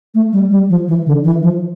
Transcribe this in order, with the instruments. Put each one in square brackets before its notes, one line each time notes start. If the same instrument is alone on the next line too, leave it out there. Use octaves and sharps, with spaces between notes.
[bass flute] A3
G3
G3
F3
E3
D3
E3
F3